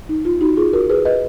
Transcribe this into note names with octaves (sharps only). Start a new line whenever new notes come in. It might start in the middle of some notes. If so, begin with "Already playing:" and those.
D#4
F4
D#4 F#4
F4 G#4
F#4 A#4
G#4 B4
B4 D#5